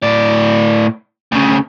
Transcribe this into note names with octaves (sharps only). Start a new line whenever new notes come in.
A2 D5
D2 C#3